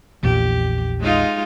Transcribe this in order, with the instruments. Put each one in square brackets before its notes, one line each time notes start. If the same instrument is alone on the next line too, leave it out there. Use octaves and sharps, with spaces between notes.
[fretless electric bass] A#1 E2 A#2 [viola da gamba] G4
[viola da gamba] G#3 D#4 F4